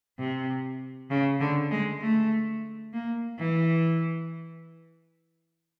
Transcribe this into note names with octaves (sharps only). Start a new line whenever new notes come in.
C3
C#3
D3
G#3
A3
A#3
E3